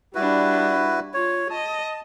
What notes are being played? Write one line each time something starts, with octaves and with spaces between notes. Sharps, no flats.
G3 D4 E4 F#4 B4
F4 C#5
D#5 A5